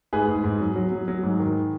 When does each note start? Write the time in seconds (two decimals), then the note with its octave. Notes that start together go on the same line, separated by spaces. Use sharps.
0.13 G#2 G#4 B4
0.28 G#2
0.44 G#2
0.60 F#3
0.76 F#3
0.91 F#3
1.08 F#3
1.23 G#2
1.40 D#3